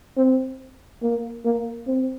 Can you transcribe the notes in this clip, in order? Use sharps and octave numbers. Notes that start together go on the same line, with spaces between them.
C4
A#3
A#3
C4